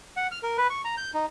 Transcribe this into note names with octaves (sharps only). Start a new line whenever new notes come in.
F#5
F6
A#4
B4
C#6
A#5
G6
D#4